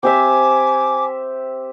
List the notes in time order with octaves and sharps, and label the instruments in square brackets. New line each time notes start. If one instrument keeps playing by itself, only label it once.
[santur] C4 G4 E5 [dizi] G#5 [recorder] D6